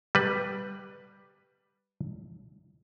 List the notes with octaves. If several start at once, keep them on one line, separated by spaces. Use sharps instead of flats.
G3 B4